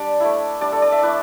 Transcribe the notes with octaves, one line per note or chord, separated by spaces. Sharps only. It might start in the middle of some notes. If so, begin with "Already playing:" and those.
Already playing: G3 D4 D5
A3 E4
G3 D4 D5
A4
D5
E5
A3 E4 B4